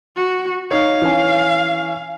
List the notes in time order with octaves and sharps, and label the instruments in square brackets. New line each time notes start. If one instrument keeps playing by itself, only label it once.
[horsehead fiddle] F#4
[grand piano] D#4 C#5 [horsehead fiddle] F5
[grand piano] E3 C#4 G#5